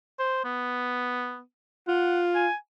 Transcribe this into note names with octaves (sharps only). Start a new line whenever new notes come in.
C5
B3
F4 F#5
G#5